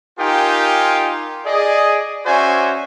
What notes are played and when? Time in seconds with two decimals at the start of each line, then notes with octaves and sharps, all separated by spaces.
0.18 D#4 F4 G4 A#4 G5 G#5
1.46 G#4 D5 D#5
2.26 C#4 F#4 C5 D5 E5 G#5